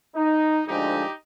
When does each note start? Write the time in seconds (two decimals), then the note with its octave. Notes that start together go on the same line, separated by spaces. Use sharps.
0.15 D#4
0.67 D2 D3 F3 G#3 D4 D#4 G4